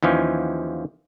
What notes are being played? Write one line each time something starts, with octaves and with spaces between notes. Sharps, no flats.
D#2 E3 F3 C#4